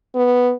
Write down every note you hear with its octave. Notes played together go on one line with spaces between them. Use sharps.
B3